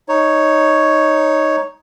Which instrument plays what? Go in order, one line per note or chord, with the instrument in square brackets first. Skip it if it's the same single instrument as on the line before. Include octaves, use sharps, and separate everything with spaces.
[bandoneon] D#4 C#5